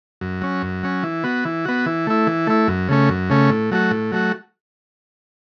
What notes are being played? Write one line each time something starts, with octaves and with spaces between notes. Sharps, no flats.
F#2
F#3 C#4
F#2
F#3 C#4
E3
B3 F#4
E3
B3 F#4
E3
A3 E4
E3
A3 E4
F#2
C#3 A3 C#4
F#2
C#3 A3 C#4
A2
F#3 A3 F#4
A2
F#3 A3 F#4